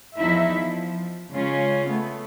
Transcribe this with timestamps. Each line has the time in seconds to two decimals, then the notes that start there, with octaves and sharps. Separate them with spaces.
0.17 E2 F3 D#4 E4 E5
0.56 F3
1.32 C#3 G#3 C#4 F4
1.89 A3 B3